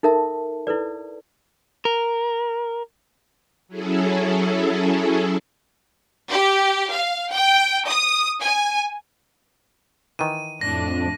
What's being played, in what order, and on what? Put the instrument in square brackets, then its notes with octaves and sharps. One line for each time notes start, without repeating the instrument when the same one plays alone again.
[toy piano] D#4 A4 A#4 E5 A5
E4 A4 B4 D5
[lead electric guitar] A#4
[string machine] F#3 C#4 E4 G#4 A4
[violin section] G4
F5
G5
D#6
G#5
[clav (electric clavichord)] D#3 E3 [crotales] D#7
[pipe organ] F2 [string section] A2 D4 [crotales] A#6